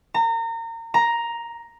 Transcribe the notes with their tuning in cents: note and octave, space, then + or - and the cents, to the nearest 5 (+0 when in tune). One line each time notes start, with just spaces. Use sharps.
A#5 -30
A#5 +5